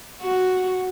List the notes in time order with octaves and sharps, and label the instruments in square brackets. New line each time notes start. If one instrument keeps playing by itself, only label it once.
[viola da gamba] F#4